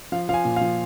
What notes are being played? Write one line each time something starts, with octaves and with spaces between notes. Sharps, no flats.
F3 F5
F3 F5 G#5
A#2
F5
F3